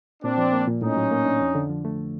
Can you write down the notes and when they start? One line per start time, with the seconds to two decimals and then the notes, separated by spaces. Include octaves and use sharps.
0.23 A#2 C4 D4
0.38 F3
0.53 A#3
0.67 A#2
0.82 A2 C#4 D#4
0.96 F#3
1.11 A#3
1.26 D4
1.41 F2
1.55 D3
1.69 F3
1.85 A3